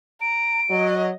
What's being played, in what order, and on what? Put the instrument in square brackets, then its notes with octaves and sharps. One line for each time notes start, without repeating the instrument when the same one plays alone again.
[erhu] A#5 [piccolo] D7
[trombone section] F#3 [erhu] D#5